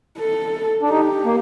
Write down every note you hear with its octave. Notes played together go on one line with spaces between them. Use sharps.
A4
D4
D#4 G4
A#3